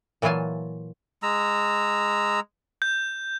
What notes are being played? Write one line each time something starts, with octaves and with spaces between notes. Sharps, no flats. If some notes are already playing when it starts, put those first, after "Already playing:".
A#2 E3 F#3 F4 G#5 A5
G#3 A#5 E6
G6